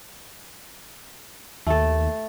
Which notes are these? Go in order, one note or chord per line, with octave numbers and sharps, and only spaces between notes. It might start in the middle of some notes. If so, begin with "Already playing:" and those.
D#2 A3 A4